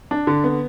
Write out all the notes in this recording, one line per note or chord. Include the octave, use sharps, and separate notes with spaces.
D4
D3
B3